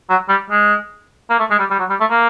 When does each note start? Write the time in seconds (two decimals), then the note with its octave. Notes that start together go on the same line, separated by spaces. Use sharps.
0.10 F#3
0.29 G3
0.50 G#3
1.30 A#3
1.39 A3
1.50 G#3
1.59 G3
1.70 G3
1.79 F#3
1.90 G3
2.00 A3
2.10 A#3